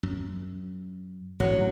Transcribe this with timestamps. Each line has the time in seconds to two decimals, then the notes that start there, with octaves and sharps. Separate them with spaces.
0.03 F#2
1.40 A1 D3 F#3